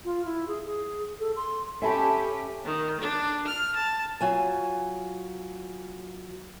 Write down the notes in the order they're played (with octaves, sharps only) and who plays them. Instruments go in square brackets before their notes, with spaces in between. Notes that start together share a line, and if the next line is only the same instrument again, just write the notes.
[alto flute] F4
E4
G#4
G#4
A4
C6
[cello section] C#4 G4 [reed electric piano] A4 G#5 B5 [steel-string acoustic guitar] E5 A5
[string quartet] D#3
D4
F6
A5
[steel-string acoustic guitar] F#3 F4 G#5